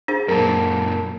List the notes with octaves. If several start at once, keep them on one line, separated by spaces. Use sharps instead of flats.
D4 G#4 C5
F#2 A#2 A#4 A5